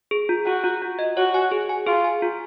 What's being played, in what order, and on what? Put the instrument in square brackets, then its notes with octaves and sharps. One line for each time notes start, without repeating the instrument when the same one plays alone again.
[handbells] G#4
F4
[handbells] F4 [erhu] F#4
[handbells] F4
F4
D#5
[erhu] F#4 [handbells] C#5
[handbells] G#5
G#4
G#5
[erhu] F4 [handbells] G#4
[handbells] G#5
F4